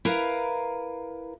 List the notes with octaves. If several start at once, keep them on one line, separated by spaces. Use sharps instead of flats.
E4 A#4 B4 F5 A#5